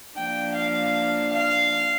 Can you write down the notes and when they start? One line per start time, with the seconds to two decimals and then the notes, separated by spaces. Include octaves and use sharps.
0.17 F3 A#3 D4 G5
0.56 F5
1.33 F5